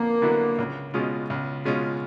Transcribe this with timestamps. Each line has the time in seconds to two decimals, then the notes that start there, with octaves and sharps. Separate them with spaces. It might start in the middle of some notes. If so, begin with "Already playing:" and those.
Already playing: F2 D3 A#3 B3
0.22 D3 F#3 B3 E4
0.58 C#2
0.94 B2 G#3 C#4 F4
1.30 C#2
1.65 B2 G#3 C#4 F4